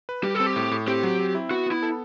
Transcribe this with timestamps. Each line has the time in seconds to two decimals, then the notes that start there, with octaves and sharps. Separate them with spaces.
0.09 B4
0.23 G3 G4
0.35 A4
0.40 C4
0.46 G4
0.56 A2
0.71 A2
0.87 C4 G4
1.03 F#3
1.20 C4
1.35 E4
1.50 B3 F#4
1.66 B3 E4
1.82 A4